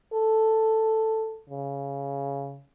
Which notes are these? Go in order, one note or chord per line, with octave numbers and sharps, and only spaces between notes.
A4
C#3